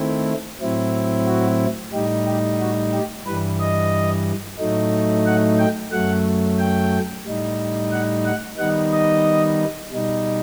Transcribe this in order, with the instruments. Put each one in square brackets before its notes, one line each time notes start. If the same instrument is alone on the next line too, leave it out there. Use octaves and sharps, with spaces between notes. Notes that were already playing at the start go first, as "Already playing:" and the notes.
Already playing: [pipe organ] D#3 A3 C4 E4
A2 F#3 C4 E4
F#4
A2 G3 D#4 G4
G4
F#4
G4
G2 E3 G3 B4
D#5
A2 F#3 A3 D#4
F#5
G5
F#2 F#3 A3 F#5
G5
A2 G3 D#4
F#5
F#5
D#3 G3 B3 D#4 F#5
D#5
B2 G3 D#4